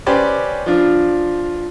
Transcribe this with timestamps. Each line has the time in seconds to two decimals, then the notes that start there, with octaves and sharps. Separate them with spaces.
0.06 C#4 G4 B4 C5 D5
0.66 F3 D4 F4